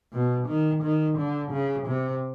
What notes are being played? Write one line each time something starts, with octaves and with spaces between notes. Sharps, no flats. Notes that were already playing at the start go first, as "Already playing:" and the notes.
B2
D#3
D#3
D3
C#3
C3